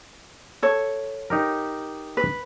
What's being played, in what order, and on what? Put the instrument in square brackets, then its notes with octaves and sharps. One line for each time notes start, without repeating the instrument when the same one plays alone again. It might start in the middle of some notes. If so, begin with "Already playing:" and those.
[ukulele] A4 C#5
[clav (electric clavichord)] D#4 G4 A#4
[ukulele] B4